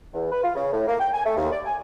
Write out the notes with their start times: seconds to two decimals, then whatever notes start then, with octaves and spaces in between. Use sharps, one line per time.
0.14 E2
0.31 B4
0.44 F4
0.55 C#3
0.73 A2
0.88 A#3
1.00 G5
1.14 G#5
1.26 A3
1.37 D#2
1.52 D5
1.66 G#5